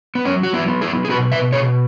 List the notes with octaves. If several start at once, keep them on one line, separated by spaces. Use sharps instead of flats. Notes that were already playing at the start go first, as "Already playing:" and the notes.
B3
F#3 C#4
F#4
B3 E4
B3
E4 G#4
G#4
B2 F#4 B4
B4 E5
B2 G#4 C#5